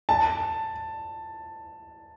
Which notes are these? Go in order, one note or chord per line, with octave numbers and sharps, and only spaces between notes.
A5